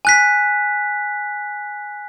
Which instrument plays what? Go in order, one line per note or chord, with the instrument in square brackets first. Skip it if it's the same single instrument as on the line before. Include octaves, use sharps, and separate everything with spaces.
[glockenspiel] G#5 F#6 B6